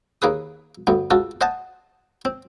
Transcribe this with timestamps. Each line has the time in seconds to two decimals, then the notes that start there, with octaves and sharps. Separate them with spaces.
0.22 D#2 A#3 G#4 B4 D#6
0.87 D2 G2 B3
1.11 C#2 F4 F#4 A4
1.41 C5 D#5 F#5 G#5 A5
2.25 C4